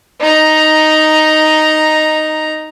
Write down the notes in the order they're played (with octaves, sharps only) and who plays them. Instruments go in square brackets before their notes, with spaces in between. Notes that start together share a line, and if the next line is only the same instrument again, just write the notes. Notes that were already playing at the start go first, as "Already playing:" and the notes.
[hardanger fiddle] D#4 A#5